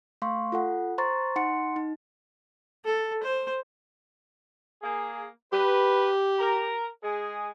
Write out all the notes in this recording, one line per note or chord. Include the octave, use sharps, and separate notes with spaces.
A3 F5 C6 C#6
F4 A4 F#5
C5 A#5 C6 C#6 A6
D#4 F#5 C6 C#7
D#4
A4
C5
A#3 G#4
G4 B4
A#4 A#5
G#3 G#4